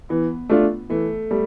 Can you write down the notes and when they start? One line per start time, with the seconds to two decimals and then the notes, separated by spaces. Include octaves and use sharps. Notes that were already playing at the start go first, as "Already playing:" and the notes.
0.09 E3 B3
0.49 A3 D4 F4
0.90 E3 A3
1.31 G3 A3